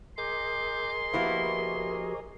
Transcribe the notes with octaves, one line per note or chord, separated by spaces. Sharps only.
G#4 A#4 D#5 C6 D6 G6
F3 A#3 B3 E4 F#4 G4